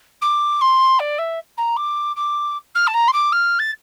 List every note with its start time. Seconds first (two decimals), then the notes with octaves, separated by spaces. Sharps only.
0.21 D6
0.61 C6
0.99 D5
1.18 E5
1.57 A#5
1.76 D6
2.16 D6
2.75 F6
2.87 A5
2.94 A#5
3.08 C6
3.13 D6
3.32 F6
3.59 A6